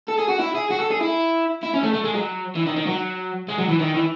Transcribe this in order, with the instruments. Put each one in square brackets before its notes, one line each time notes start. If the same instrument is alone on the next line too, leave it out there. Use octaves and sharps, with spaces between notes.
[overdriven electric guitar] A4
G#4
F#4
E4
G#4
F#4
A4
G#4
E4
E4
C#4
A3
A3
G#3
F#3
E3
D#3
D#3
F#3
G#3
F#3
E3
D#3
E3